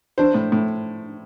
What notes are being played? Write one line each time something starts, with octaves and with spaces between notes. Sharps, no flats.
D4 C5
A2
A2